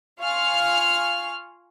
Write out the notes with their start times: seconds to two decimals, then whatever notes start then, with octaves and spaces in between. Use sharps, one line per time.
0.20 F4 F5 G#5 C#6 F6